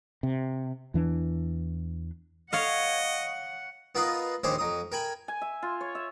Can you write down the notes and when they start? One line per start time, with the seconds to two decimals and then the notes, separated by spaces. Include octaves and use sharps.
0.23 C3
0.94 E2 E3 D4
2.53 C#5 D#5 F5 F#5
3.95 B3 F4 A#4 B4 D#5 F5
4.44 A#1 D#2 D#3 G4 G#4 C5
4.58 F2 A#5 D#6
4.92 A#4 G5 G#5 B5
5.28 G#5
5.42 E5
5.63 F4
5.81 C#5
5.95 E5